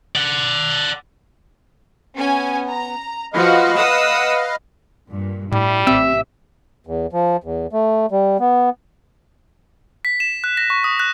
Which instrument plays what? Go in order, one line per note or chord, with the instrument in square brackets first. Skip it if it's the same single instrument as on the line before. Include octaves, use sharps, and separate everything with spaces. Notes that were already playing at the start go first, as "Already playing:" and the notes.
[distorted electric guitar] D5 F#5
[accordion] B3 [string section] C#4 G#5
[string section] A#5
[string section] F3 F#4 [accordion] B4 D#5 F5
[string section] F#5 D#6 E6
G2 A#2
[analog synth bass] A2 [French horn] G3 [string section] E4
[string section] A1 C3 G4 [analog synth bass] C4 [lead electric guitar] E5
[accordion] E2
F3
E2
A3
G3
B3
[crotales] B6
E7
F#6
A#6
C#6
D#6
F#6